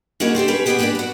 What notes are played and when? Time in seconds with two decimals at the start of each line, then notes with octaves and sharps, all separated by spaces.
0.20 A#3 C#4 D#4 E4 F#4 G#4
0.35 D3 G4 A4 C5
0.48 C#4 G4 G#4 B4
0.66 B3 G4 G#4 A#4 B4 C#5
0.79 D4 G4 G#4 A#4 B4 D5
0.95 F#4 B4